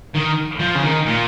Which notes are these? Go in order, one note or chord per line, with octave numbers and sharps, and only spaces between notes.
D#3
F3
C#3
D#3
A#2